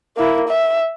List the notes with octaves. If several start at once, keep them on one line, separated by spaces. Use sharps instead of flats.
A#3 E4
E5